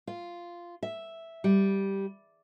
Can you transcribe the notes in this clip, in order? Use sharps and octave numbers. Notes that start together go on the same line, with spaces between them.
F4
E5
G3